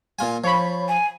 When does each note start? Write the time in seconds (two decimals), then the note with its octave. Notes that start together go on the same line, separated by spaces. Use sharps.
0.19 A#2 F4 G#5
0.44 F3 C#5 B5
0.88 G#5